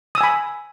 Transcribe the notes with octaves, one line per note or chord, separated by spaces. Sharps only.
G#5 B5 D#6 E6